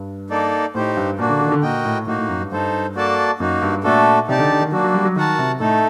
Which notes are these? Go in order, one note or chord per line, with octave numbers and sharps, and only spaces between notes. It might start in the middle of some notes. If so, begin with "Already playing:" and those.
Already playing: G2
A#3 D#4 A4 D5
A2 D#4 G4 C5
G2
A#2 A#3 D4 F#4
D3
D3
D#3
D3
A#2 F#4 A#4 D#5 G5
A2
A2 A#3 D#4 F#4
A2
F#2
G2
G2 D#4 A4 C5
A#3 F#4 A4 D5 A5
F#2 A#3 D#4 F#4
G2
A#2 A3 D4 F#4 A4
C3 D#4 G4 D5 A5
D3
D3
D#3
F#3 A#3 D4 F#4
F#3
G3
F#3
D#3 F#4 A#4 F#5 A5
C3
A2 A3 D#4 A4